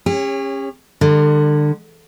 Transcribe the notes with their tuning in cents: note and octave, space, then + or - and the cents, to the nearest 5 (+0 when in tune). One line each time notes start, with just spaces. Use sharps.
C#4 -20 G4 +45 C#5 +0
D3 +25 G3 +45